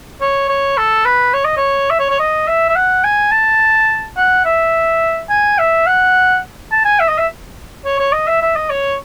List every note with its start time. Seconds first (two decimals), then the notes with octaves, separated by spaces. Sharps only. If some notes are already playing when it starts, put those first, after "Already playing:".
0.21 C#5
0.49 C#5
0.78 A4
1.05 B4
1.34 C#5
1.45 D#5
1.57 C#5
1.90 E5
2.00 C#5
2.10 C#5
2.20 D#5
2.48 E5
2.69 E5
2.76 F#5
3.04 G#5
3.32 A5
4.17 F#5
4.46 E5
5.30 G#5
5.59 E5
5.87 F#5
6.72 A5
6.85 G#5
7.00 E5
7.09 D#5
7.18 E5
7.85 C#5
8.00 C#5
8.13 D#5
8.28 E5
8.42 E5
8.56 D#5
8.70 C#5